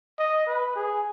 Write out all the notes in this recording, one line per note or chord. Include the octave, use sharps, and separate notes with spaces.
D#5
B4
G#4